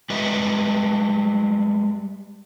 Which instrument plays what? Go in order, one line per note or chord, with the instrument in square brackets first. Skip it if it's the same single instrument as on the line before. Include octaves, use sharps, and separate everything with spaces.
[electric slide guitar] G3 G#3 G4 B4 D#5 E5